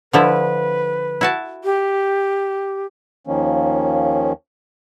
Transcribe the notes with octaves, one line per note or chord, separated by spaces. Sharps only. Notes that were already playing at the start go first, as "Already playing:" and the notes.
D3 F3 E4 B4
E4 F#4 A5
G4
D#2 D#3 F3 A#3 C#4